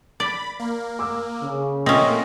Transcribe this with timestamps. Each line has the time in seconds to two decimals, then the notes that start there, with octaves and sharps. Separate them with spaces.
0.20 D5 B5
0.60 A#3
0.99 D6 E6
1.43 C#3
1.86 A#2 A3 A#3 C4 C#4 D#5 D#6 A#6